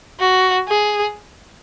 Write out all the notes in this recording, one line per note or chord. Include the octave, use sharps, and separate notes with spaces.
F#4
G#4